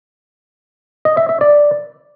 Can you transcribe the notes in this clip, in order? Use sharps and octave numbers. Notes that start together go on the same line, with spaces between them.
D#5
E5
E5
D5